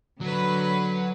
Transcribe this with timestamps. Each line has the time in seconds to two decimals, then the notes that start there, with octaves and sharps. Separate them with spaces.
0.21 D3 F#3 B4